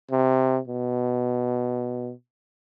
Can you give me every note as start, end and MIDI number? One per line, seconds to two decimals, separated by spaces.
0.11 0.59 48
0.68 2.12 47